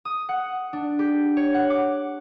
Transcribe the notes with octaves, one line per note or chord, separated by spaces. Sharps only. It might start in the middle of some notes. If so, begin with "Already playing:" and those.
D#6
F#5
D4
G4
C#5
F#5
D6